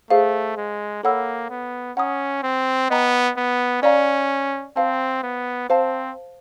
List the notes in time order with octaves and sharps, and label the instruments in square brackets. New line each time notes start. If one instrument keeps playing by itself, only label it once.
[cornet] A3 [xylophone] G#4 C5 F5
[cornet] G#3
[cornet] A#3 [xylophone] A4 C#5 F#5 B5 E6
[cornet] B3
[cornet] C#4 [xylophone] F#5 A#5 D#6
[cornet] C4
[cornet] B3 [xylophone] D#5 G5 A#5
[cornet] B3
[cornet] C#4 [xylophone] D5 F5 A#5
[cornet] C4 [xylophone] C5 F5 A5
[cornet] B3
[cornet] C4 [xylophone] C5 F5 A5